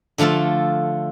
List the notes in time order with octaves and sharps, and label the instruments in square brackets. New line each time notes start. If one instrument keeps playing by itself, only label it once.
[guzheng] D3 F3 A3 F4 A4